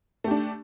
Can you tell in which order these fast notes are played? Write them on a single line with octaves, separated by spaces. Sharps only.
A3 G4 D4